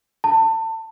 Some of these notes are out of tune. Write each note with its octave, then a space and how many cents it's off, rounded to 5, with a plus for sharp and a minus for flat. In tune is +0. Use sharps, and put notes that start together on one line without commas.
A5 +30